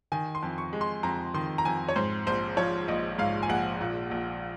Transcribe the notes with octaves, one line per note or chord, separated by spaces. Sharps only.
D#3 G#5
C6
F2
C#6
G#3
C6
F2 A#5
D#3 C6
A#5
F2 G#5
C#5
G#2 C5
A#1 C5
F3 C#5
A#1 D#5
G#2 F5
G#5
A#1 F#5
A#2
A#1